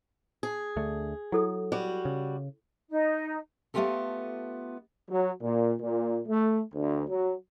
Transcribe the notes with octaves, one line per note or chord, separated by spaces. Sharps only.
G#4
D2 D3 A3
F#3 E4 A4 D#6
G3 F#4
C#3
D#4
A3 B3 C4 F4 G4 A4
F#3
A#2
A#2
A3
D2
F#3